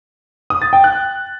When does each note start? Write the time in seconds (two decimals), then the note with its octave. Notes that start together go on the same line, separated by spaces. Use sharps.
0.50 D#6
0.62 A6
0.73 G5
0.84 F#6